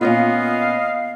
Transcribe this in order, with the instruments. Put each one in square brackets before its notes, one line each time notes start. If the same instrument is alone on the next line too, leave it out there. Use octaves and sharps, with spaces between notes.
[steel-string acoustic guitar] A#2 C#4 F4 [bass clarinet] B3 [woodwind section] D#5 F5